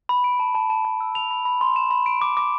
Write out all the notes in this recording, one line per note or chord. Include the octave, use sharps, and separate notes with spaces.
B5
D7
A5
A5
A5
A5
E6
F7
B5
B5
C6
E7
B5
D7
D6
D6